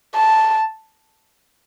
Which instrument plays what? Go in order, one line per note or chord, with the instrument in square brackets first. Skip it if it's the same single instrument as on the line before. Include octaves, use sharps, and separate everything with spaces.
[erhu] A5